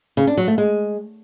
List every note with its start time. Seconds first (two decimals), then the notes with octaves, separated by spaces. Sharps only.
0.17 C#3
0.27 D4
0.37 F#3
0.48 A3
0.58 G#3